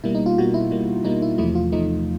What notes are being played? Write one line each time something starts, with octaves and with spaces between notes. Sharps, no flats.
B2 G3 A#3 E4
D#4
F4
B2 G3 A#3 F#4
E4
B2 G3 A#3
B2 G3 A#3 D#4
E4
E2 C3 F3 A3 E4
F4
E2 C3 F3 A3 D#4